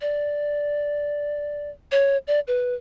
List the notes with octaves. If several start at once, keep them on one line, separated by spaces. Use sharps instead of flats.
D5
C#5
D5
B4